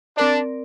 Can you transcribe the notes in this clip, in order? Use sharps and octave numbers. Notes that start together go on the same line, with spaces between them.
C4 D4 A#4 D5